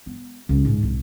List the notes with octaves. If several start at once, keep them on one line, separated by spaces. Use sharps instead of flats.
B3
C#2
G#2
C2